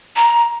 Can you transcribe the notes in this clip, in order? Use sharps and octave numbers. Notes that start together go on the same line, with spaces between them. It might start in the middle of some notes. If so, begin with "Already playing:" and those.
A#5